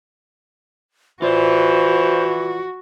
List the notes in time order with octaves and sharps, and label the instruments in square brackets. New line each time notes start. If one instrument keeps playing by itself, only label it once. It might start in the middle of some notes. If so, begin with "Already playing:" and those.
[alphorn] E3 [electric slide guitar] F4 D5 [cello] F#4 [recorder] C5